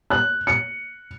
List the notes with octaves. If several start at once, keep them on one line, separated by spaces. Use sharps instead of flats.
F#6
C#7